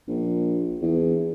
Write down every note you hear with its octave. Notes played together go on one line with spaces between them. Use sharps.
A#1
E2